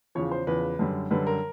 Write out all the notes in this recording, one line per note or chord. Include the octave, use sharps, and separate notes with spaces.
E2 C#3 F3 C#5
C5
E2 C#3 F3 B4
F#2 D3 G3
F#2 D3 G3 B4
A#4